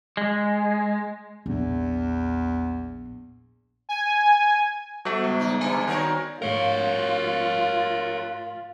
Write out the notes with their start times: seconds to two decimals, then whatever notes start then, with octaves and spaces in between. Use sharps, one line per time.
0.17 G#3
1.46 A#1 E2
3.89 G#5
5.05 G3 B3 F#4 A4
5.24 C#2
5.39 G#2 D#4
5.61 G2 D3 E3 E5 G#5 A#5
5.88 D#3 C4 F#4 A#4 C#5
6.42 G#2 A3 F4 A#4 C#5 F5